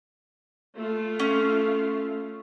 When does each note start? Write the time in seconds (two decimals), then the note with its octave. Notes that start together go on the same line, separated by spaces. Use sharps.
0.76 A3 F4
1.19 C#4